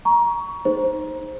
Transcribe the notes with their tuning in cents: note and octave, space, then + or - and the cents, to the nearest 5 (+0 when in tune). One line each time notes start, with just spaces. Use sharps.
A#5 +25 C#6 +20
D#4 +0 G#4 +0 C5 +5